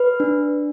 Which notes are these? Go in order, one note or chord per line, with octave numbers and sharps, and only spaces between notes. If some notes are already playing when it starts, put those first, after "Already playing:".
Already playing: B4
D4